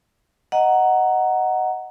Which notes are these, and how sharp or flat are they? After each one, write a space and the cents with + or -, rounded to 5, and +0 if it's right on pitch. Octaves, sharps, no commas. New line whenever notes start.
D#5 +0 F#5 +5 A#5 +0